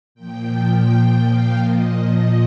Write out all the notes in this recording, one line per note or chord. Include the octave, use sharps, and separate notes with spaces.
A#2 F3 G5
G5
F5
A#2 F3 D#5
D#5